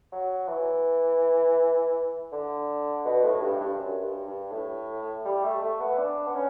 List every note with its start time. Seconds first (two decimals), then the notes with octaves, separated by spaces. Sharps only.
0.12 F#3
0.48 E3
2.32 D3
3.05 B2
3.24 A2
3.41 G2
3.61 G2
3.78 F#2
4.03 G2
4.27 G2
4.52 A2
5.25 G3
5.44 A3
5.62 A3
5.80 B3
5.98 D4
6.27 B3
6.34 C#4